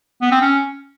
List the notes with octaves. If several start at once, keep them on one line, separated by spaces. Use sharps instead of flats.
B3
C4
C#4